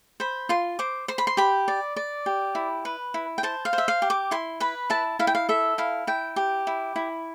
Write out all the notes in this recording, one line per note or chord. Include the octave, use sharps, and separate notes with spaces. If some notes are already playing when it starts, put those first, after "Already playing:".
C5 B5
F4 C6
C5 D6
C5 C6
B5
C6
G4 B5
D5
D5
G4
E4
B4
E4
G5
C5 A5
F5
C5
E5
F5
G4
D6
E4 C6
B4 B5
E4 A5
E4 F5
G5
F5
A4 E5
E4 F5
E4 G5
G4
E4
E4